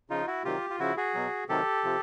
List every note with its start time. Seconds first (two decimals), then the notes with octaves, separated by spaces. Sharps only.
0.10 C#3 F3 D#4 F4
0.27 E4 F#4
0.44 C3 D#3 F#3 F4 G4
0.70 F4
0.79 C#3 F3 E4 F#4
0.97 F#4 G#4
1.15 B2 F#3
1.49 C3 D#3 F#3 G4 A4
1.84 C3 F3